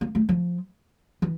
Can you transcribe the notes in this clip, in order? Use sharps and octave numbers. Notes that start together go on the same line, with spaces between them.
A#3
A3
F3
E3